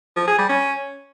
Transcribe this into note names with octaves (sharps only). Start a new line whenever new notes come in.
F3
G#4
G3
C#4